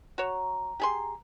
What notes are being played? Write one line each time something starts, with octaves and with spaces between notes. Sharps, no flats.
F#4 C#5 A#5
G4 G#4 C6